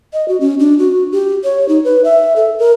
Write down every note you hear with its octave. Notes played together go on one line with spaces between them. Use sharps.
D#5
F#4
C#4
D4
F#4
G4
C#5
D#4
B4
E5
A4
A#4